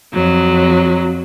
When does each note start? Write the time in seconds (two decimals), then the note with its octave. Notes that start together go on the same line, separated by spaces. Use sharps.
0.13 F2 F#3